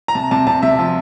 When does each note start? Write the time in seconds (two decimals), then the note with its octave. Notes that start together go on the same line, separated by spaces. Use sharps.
0.08 A#5
0.15 C3 A5
0.31 C3 A5
0.47 C3 A5
0.63 C3 E5
0.79 F3